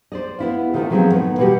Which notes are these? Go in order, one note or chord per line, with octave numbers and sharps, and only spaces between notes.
C5 D5 D#5
B3 E4 F4
C3 D#3 A3 D#4 F4
D#3 F3 F#3 G#3 B3 C4
A2 B3 D#4
B2 E3 G3 F#4 G4